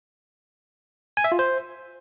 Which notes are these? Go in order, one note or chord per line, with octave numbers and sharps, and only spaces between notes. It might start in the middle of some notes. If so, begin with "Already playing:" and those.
G#5
E5
F4
C5